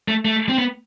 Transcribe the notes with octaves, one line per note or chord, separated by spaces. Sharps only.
A3
A3
C4
B3